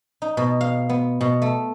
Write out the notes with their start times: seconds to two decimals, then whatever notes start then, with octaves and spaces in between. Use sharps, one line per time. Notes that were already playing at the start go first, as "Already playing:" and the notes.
0.22 D#4
0.37 B2
0.61 F5
0.89 B3
1.21 B2
1.42 A3